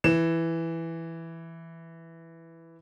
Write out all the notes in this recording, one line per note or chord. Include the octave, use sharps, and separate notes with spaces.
E3 E7